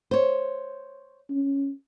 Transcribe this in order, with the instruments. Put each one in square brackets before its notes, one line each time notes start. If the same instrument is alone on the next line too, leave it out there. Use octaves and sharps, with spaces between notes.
[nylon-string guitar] C5 C#5
[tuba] C#4